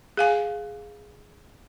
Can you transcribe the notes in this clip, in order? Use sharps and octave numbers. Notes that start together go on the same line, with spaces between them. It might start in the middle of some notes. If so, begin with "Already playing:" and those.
G#4 F5 G#5